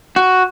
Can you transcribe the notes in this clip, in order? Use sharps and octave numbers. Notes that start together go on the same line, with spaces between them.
F#4